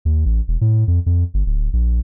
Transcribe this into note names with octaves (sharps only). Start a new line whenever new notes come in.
D#2
A1
E1
A2
F2
F2
G1
D1
A#1